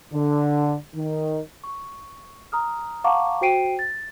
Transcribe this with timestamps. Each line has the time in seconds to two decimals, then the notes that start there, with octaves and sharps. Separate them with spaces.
0.12 D3
0.94 D#3
1.64 C#6
2.52 A#5 D#6 F6
3.04 F5 F#5 A5 A#5 C#6 D6
3.41 F#4 C5 G5 C7 D7 D#7
3.79 A6